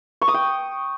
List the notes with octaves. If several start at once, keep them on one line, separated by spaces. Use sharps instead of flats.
C#6
D#6
G5